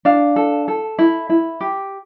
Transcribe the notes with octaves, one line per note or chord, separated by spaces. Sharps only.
D4 F5
A4
A4
E4
E4
G4